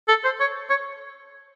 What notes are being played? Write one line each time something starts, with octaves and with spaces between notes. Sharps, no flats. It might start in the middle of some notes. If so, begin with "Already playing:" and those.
A4
C5
C#5
C#5